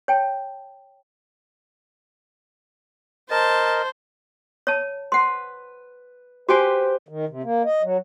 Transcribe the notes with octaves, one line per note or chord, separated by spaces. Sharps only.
C#5 G5 A5
A#4 C5 D#5 A5
C#5 A5
B4 F#5 C6
F#4 G4 B4 C5 G#5
D#3
C3
A#3
D#5
F#3